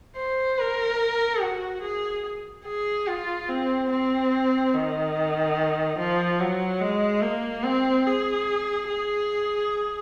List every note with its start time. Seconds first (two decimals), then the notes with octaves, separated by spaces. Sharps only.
0.16 C5
0.59 A#4
1.41 F#4
1.83 G#4
2.66 G#4
3.08 F4
3.49 C4
3.91 C4
4.74 D#3
5.99 F3
6.40 F#3
6.81 G#3
7.23 A#3
7.64 C4
8.07 G#4
8.89 G#4